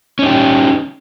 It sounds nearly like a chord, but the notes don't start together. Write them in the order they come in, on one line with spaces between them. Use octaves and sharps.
C#4 D#4 G4